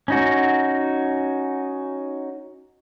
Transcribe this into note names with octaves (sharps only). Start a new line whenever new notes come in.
C#4 D#4 F#4